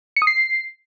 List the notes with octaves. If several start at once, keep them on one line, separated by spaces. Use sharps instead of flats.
C#7
D#6
C7